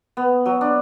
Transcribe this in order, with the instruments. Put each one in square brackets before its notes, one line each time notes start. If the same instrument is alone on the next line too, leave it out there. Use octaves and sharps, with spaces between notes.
[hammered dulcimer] B3
F#3
D4